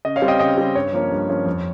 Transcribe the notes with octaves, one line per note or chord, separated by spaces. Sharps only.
C#3 D#5
C#5 F5
G3 C4
D#5 G5
C#3 D#5 G5
G3 C4
G2 C#5
F3 A#3 C#4
G2
F3 A#3 C#4
F2